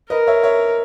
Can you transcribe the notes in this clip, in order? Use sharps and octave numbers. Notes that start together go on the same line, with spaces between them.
A#4 B4 D#5
C#5 E5
C#5 E5